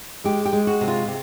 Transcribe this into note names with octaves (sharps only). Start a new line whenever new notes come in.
G#3 G4
G4
G#3
F#4
C3
F4
C3